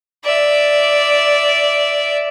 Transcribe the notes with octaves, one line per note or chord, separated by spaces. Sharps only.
D5 E5